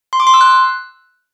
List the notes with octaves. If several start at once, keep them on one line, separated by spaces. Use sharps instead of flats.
C6
D6
C6
E6
F#6